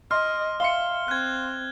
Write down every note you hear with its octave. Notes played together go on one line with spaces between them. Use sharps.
D#5 C6 F6
E5 F5 C6 C#7 G7
C4 F#6 G#6